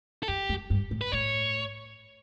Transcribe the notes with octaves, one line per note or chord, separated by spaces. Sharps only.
A4
F#2 G4
F#2
G2
A2
B4
A2 C#5